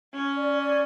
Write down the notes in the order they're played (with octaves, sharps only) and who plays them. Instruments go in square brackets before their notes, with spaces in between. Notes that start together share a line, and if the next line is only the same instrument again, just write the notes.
[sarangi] C#4
[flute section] D5
D5